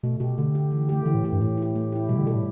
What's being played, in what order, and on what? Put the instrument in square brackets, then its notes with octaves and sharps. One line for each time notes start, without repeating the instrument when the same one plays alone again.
[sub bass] B2 [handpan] A3
[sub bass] B2 [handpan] G4
[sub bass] D3 [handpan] A3
[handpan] G4
E3
A3 G4
[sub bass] D3 [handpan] E3
[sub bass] A2
[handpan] A3 G4
[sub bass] G2
[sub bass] A2 [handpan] A3
[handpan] E4 G4
A3
E4 G4
[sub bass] B2 [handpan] G3
[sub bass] D3
[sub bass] B2 [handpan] E4 A4
[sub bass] A2